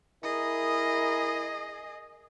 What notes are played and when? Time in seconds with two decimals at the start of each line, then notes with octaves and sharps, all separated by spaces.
0.23 E4 G#4 A#4 D#5